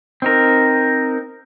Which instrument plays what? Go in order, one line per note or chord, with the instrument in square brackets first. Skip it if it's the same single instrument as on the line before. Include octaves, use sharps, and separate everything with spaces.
[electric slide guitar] C4 D#4 A#4